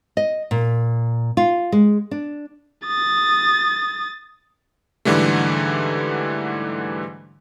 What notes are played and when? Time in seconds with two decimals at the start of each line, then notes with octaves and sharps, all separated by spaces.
0.17 D#5
0.51 A#2
1.37 F4
1.72 G#3
2.11 D4
2.87 D#6 A6
5.05 G#2 D3 E3 G3 A3